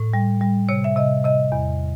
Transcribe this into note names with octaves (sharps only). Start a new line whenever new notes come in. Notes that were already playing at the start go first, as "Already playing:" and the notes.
Already playing: A2
G3
G3
C3 C#5
E5
C3 D#5
C3 D#5
E2